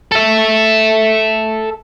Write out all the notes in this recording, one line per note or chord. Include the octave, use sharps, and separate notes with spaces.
A4 E5